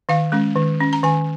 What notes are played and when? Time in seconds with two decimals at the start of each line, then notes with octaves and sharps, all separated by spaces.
0.09 D#3 F5
0.32 G#3 C#4
0.56 D#3
0.80 C#4
0.93 A#5
1.03 D#3 G#5